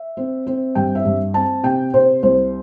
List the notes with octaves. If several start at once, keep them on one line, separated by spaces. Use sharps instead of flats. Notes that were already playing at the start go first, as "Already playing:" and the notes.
Already playing: E5
C4
C4
G2 G5
E5
G2
C4 A5
C3 G5
C3 C5
C2 C5